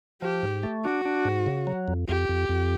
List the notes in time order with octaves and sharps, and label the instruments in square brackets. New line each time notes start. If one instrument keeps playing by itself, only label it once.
[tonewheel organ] F3 [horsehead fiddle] G4
[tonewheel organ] G#2
A3
[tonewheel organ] D4 [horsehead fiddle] F#4
[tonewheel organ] D4
G#2
C#3
F#3
F2
[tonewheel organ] F2 [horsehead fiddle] G4
[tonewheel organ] F2
F2